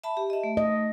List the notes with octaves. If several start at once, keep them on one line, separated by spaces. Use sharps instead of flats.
E5 A5 B5
G4
D#5 E5
A3
D#5